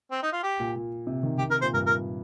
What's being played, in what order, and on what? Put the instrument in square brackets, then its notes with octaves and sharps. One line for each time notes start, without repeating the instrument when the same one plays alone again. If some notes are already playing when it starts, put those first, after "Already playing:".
[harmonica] C4
D#4
F4
G4
[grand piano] A#2
A#2
C3
D#3
[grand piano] D#3 [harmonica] G4
[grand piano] C3 [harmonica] A#4
[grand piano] A#2 [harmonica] C5
[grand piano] G2 [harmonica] A#4
[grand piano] A#2 [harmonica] A#4